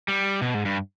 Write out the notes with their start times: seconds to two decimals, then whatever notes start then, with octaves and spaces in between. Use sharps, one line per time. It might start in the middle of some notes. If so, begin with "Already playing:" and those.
0.08 G3
0.42 B2
0.54 G#2
0.65 G2